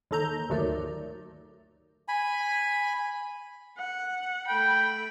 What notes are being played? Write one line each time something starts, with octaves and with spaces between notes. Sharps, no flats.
D#2 D#3 A4 A#5 G6
G1 D2 D#3 F#3 A3 D5
G#5 B5
F#5
A3 G5 B5